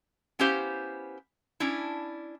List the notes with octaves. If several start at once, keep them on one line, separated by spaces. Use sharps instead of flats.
B3 C#4 E4 G4 C5 F5
C#4 D4 E4